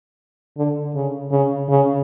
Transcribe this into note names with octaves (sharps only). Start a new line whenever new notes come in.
D3
C#3
C#3
C#3